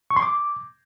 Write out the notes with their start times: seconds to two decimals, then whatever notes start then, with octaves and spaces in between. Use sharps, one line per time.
0.10 C#6
0.16 C6
0.22 D6